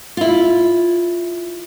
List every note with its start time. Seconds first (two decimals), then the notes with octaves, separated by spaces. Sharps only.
0.17 E4 F4